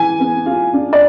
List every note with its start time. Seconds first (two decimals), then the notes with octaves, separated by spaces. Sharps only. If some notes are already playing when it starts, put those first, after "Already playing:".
Already playing: E3 G#5
0.20 B3
0.46 F4
0.73 D4
0.93 D5